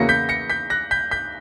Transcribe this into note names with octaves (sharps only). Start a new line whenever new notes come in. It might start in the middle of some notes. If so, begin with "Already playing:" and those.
Already playing: E2 C#3 F#3 A#3 E4 A#6 C#7
G6 B6
A#6 C#7
G6 B6
F#6 A#6
G6 B6
G6 B6